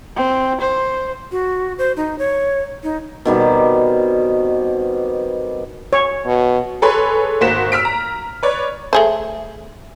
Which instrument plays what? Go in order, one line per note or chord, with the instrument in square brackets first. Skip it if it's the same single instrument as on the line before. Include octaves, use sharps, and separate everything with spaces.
[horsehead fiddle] C4
C5
[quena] F#4
C5
D#4
C#5
D#4
[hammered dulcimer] B2 D#3 G3 C4
[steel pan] C#5
[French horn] B2
[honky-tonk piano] G#4 A4 B4 C#5 B5 C6
G#1 A#3 F#4 C5 B6 E7
E6 F6 B6 D7
A#5
B4 C#5 D5
[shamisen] A3 G#4 C5